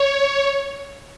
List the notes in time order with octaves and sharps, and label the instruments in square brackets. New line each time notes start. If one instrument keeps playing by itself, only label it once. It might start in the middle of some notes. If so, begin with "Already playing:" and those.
Already playing: [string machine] C#5